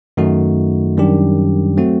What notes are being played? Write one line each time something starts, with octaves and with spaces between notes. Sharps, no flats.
F#2 D#3 A3 D#4 F#4
F#2 D#3 G3 D4 G4
F#3 A3 C4 F#4